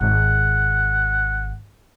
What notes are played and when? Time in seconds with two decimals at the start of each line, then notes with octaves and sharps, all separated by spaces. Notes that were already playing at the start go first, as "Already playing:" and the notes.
0.01 G#1 F#5